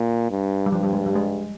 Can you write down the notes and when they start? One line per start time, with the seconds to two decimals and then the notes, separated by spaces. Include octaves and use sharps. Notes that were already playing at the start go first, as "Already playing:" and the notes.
Already playing: A#2
0.31 G2
0.66 G3
0.72 G2 F3
0.83 G3
0.93 G#3
1.06 G3
1.15 G#3